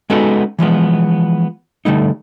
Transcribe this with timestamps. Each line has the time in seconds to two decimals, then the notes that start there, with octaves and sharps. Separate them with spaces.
0.10 G#3 B3 C#4 D#4 F#4 A4
0.59 E3 F3 G#3 B3
1.85 D3 G3 A3 D#4